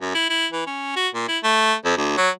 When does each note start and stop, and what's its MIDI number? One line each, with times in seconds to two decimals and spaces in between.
0.01 0.13 42
0.15 0.28 64
0.30 0.47 64
0.53 0.64 52
0.67 0.92 61
0.96 1.08 66
1.15 1.26 46
1.29 1.38 64
1.44 1.74 57
1.85 1.94 41
1.97 2.16 38
2.17 2.30 54